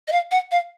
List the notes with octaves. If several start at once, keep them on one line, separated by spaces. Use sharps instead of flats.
D#5
F5
F#5
F5